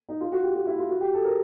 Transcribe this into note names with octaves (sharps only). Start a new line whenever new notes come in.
D#4
F4
F#4
G4
F#4
E4
F4
F#4
G4
A4
A#4